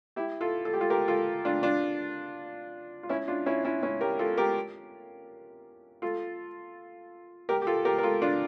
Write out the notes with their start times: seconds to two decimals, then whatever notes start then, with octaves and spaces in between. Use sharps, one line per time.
0.16 E4 G4
0.41 F4 A4
0.65 A4
0.73 G4
0.81 F4 A4
0.90 G4 A#4
1.08 F4 A4
1.45 D4 F4
1.63 D4 F4
3.03 F4
3.09 C#4 E4
3.28 D4 F4
3.46 C#4 E4
3.65 C#4 E4
3.83 C#4 E4
4.01 G4 A#4
4.19 F4 A4
4.37 G4 A#4
6.02 F4 A4
7.49 G4 A#4
7.62 G4
7.67 F4 A4
7.85 G4 A#4
7.98 A#4
8.03 F4 A4
8.22 D4 F4